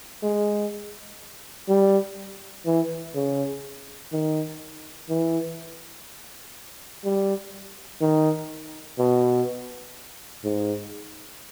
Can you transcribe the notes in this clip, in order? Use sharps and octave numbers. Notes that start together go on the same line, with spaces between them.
G#3
G3
E3
C#3
D#3
E3
G3
D#3
B2
G#2